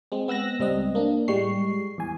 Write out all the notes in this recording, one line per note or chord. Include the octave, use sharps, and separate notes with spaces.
G#3 C4
B3 E6 F#6 A#6
C#2 G3 C4 D#5
A#3 D4
A2 G3 G#3 C#6 C7
E2 G#5